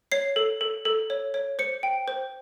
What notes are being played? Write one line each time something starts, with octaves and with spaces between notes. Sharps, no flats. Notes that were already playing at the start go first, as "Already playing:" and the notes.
C#5 C7
A4
A4
A4
C#5
C#5
C5 C#7
G5
C5